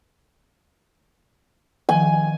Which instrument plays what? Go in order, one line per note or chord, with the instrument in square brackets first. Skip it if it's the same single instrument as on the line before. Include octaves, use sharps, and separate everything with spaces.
[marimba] D#3 F3 [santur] G#5